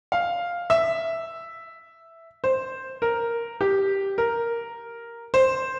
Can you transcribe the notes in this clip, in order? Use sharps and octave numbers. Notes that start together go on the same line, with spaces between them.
F5
E5
C5
A#4
G4
A#4
C5